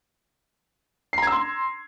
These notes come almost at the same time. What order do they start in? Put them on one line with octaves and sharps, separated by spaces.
C7 A#5 G#6 E6 C6